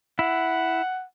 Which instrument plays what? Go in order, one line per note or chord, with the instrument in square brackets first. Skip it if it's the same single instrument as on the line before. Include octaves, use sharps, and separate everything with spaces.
[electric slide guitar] E4 [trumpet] F#5